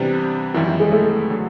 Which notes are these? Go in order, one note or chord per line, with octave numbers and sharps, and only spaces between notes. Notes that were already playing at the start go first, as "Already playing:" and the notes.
Already playing: C3 E3 G3 B3 D4
F#2 D#3 E3 G3 B3 E4
E3
G#3
A3
D3 F#3